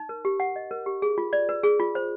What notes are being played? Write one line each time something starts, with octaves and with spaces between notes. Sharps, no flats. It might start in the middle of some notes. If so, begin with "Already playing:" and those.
Already playing: D#4
A#4
G4
F#5
D#5
A#4
G4
G#4
F4
D5
B4
G#4
F4
C5